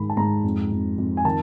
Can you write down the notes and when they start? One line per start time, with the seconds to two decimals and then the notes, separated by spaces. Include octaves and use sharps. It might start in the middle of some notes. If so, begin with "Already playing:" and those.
Already playing: G#2 D#3 B5
0.10 A5
0.17 G#2 A#5
0.44 F2
0.72 F2
0.98 F2
1.17 G#5
1.25 D#3 A5